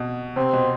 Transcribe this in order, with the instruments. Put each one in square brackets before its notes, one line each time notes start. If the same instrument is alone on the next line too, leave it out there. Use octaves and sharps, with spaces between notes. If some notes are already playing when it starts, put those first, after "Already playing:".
Already playing: [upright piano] B2
[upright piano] C3 [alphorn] C4
[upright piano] B2